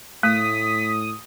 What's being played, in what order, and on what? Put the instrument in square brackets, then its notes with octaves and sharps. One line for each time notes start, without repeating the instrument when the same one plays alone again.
[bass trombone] A2 [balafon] A3 [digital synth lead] D#6 [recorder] B6